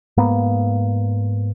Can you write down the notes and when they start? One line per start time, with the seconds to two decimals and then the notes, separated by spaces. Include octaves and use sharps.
0.17 G#2 A#3 B3